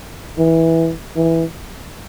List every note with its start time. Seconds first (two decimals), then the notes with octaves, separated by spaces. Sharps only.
0.38 E3
1.16 E3